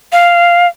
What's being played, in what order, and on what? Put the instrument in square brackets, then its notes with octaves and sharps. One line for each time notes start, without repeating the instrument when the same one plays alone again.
[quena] F5